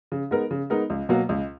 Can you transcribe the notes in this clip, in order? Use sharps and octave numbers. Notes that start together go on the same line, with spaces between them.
C#3
G#3 B3 D#4 A#4
C#3
G#3 B3 D#4 A#4
C#2
B2 F#3 A#3
C#2